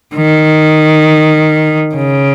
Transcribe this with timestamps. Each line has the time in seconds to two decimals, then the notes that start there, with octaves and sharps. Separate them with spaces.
0.15 D#3
1.95 C#3